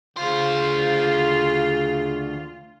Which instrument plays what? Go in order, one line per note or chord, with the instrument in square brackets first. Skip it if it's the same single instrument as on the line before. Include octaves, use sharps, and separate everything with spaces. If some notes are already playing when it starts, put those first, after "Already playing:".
[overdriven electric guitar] D2 C5 [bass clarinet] C#3 [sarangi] F4